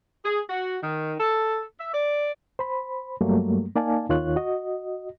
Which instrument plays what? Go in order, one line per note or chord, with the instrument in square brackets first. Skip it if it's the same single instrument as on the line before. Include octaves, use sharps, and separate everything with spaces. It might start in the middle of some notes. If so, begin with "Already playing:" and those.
[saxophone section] G#4
F#4
D#3
A4
E5
D5
[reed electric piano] C5 B5
G2 F#3 G3 A3 A#3
A#3 D#4 D5 F5 G#5 A5
D#2 D#3 F4 C#5 F#6
F#4 D#5